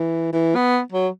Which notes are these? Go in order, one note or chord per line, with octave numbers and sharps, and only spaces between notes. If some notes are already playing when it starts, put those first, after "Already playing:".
Already playing: E3
E3
B3
F#3